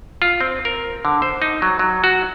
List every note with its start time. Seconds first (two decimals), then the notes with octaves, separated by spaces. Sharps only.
0.22 F4
0.41 C4
0.65 A#4
1.05 D3
1.22 C5
1.42 D#4
1.62 F#3
1.79 F#3
2.04 F#4